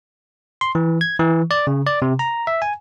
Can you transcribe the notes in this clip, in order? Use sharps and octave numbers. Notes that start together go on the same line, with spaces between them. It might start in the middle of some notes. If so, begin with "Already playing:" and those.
C6
E3
G#6
E3
D5
C#3
D5
C3
A#5
E5
G#5